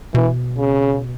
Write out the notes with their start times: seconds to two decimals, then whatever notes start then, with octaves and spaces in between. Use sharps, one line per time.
0.15 B2 E3
0.58 C#3